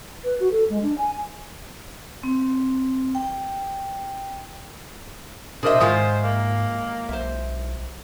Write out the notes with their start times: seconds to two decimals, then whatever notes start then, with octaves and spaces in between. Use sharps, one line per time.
0.24 B4
0.40 F#4
0.51 A4
0.70 G#3
0.82 D4
0.98 G#5
2.23 C4
3.15 G5
5.63 B2 D4 G#4 A#4 C5 D#5 E5
5.80 G#2 D#3 G#3 F4 E5
6.23 A#3
7.09 B1 C5 E5